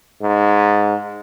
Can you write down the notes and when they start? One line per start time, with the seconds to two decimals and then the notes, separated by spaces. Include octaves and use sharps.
0.22 G#2